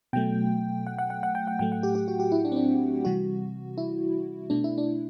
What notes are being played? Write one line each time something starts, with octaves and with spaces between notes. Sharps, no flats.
B2 F#3 A3 G5
F#5
F#5
F#5
F#5
G5
F#5
A2 F#3 A3 G5
F#5
G4
G4
F#4
G4
E4
D4
C4
D4
C3 E3 G3 F#4
E4
B2 A3 D4
E4
D4